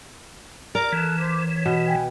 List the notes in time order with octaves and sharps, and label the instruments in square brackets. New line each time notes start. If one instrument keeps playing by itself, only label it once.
[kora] A#4 [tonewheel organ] D5
[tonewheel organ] E3 [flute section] A4 F#6
[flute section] C5 D6
C#5
[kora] B2
[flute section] B4 G5 G#5